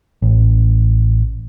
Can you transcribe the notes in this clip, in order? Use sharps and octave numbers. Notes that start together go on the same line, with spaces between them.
A1